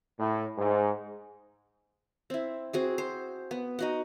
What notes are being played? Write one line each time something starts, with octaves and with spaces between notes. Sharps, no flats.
A2
G#2
C4 E4
C4 F#4 G#4
C5
B3
D#4 F#4 F#5